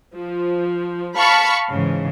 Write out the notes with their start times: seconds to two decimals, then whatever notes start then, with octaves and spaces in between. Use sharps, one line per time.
0.13 F3
1.16 F5 A5 B5 C#6
1.70 G#2 C#3 E3